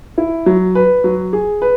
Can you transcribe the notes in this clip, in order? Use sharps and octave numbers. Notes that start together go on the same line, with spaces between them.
E4
F#3
B4
F#3
G#4
B4